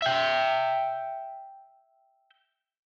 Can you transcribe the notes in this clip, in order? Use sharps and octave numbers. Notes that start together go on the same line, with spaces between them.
E5 G5